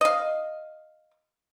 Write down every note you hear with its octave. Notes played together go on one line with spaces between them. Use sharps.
D#5 F5